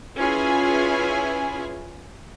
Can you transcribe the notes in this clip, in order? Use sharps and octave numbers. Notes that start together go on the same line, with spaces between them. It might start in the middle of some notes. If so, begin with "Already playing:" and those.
C#4 E4 F4 G#4 B4 G#5